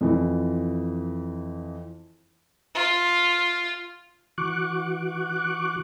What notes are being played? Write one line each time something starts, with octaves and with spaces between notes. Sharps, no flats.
F2 E3
F4
E3 F#4 C#6 D6 F#6